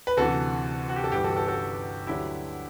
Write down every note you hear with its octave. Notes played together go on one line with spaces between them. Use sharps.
B4
D2 C3 E3 F#4 A4
F#4
G4
A4
G1 G2 E3 G4 B4
F#4 A4
F#4 A4
F#4 A4
D2 D3 F#3 E4 G4